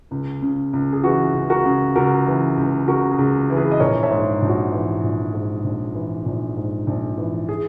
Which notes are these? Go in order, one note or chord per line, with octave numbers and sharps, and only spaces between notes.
C#2
C#3
C#2
G#4
E3 F#4
C#2
F#4 A#4
C#3
C#2 F#4 A#4
E3
C#2
C#3 F#4 A#4
G#4
C#2
E3
G#4 B4
D#5
A#1 A#4 C#5
C#5 E5
G#2
A#1
F#4
E3
A#1
G#2
A#1
E3
A#1
G#2
A#1
E3
G#4